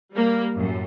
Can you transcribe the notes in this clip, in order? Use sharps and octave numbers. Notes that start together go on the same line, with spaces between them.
G3 A#3
F#2 A2